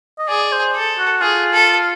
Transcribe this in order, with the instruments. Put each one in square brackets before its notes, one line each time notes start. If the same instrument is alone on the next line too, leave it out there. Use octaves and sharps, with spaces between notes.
[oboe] D#5
[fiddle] G#4 [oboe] D5
[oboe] C5
[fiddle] A4
[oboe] F#4
[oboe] F4 [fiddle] G#4
[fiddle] A4